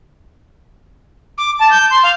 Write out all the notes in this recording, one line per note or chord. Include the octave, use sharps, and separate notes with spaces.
D6
A5
G6
C6
F5